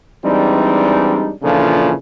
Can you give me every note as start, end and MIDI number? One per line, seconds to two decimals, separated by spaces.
0.24 1.32 52
0.24 1.32 55
0.24 1.32 56
0.24 1.32 60
0.24 1.32 62
0.24 1.32 63
1.43 1.92 46
1.43 1.92 49
1.43 1.92 52
1.43 1.92 53
1.43 1.92 62
1.43 1.92 69